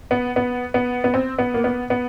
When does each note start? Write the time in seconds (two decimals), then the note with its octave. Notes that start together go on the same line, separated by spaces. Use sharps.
0.11 B3
0.36 B3
0.74 B3
1.04 B3
1.14 C4
1.39 B3
1.54 A#3
1.64 B3
1.90 B3